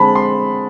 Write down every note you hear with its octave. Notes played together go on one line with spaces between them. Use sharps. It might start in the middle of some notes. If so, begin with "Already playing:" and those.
Already playing: D3 G#3 C4 A5 B5
C6